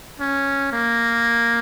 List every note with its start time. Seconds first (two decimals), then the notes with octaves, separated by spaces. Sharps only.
0.20 C#4
0.72 A#3